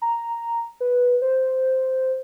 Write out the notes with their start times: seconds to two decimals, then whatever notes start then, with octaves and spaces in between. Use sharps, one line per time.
0.02 A#5
0.81 B4
1.22 C5